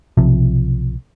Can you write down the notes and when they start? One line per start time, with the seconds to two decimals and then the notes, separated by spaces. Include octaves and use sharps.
0.17 B1 C3 F3